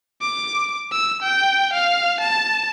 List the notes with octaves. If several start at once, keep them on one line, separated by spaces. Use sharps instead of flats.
D6
E6
G5
F5
A5